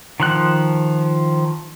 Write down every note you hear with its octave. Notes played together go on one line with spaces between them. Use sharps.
D#3 F3 F#6